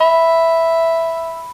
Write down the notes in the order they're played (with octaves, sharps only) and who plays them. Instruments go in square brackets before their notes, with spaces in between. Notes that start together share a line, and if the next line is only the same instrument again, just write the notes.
[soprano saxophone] E5 [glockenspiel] B5